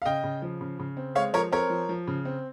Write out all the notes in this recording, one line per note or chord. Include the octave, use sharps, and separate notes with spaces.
F5
C#3 D#5 G5
C#3
F3
C#3
C#3
C4
G#3 C#5 F5
F3 A#4 C#5
C4 A#4 C#5
F3
F3
C#3
C4